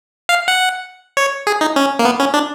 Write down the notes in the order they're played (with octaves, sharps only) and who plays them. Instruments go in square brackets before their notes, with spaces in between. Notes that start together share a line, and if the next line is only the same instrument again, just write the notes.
[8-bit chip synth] F5
F#5
C#5
G#4
D#4
C#4
A#3
B3
C#4
D4